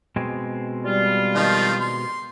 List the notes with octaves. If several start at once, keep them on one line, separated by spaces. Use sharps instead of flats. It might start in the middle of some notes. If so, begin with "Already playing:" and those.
B2 G#3 C4
G3 F4
D#3 F3 D#4
C6